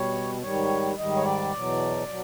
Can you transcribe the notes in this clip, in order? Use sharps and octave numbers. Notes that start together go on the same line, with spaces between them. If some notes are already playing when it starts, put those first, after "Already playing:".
Already playing: B2 G3 C#5
G#2 D#3 G3 C#5
G#2 D#3 G3 D#5
C#5
D5
E2 B2 F#3
B2 F#3